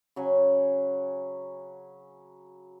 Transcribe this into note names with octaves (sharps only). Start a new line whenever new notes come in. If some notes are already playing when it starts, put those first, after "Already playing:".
C#3 F#3 C#5 G#5